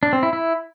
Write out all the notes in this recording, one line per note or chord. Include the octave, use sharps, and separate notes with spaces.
D4
C4
E4
E4